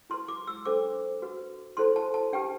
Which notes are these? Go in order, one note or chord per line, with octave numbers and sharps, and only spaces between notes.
E4 B4 C6
D6
E6
D4 A4 C5 D6
F#4 B4
E4 A4 C5 C6
A5
A5
D4 G4 B4 G5